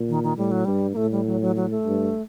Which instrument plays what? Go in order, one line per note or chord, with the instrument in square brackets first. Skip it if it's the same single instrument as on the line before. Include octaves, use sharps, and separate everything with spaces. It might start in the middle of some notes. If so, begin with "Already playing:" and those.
Already playing: [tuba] A#2
[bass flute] D#3
D#3
[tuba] A2 [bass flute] G3
[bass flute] F#3
[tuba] G2 [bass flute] G3
[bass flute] A#3
[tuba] A2 [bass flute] A3
[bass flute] G3
F#3
F#3
F#3
A3
[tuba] G2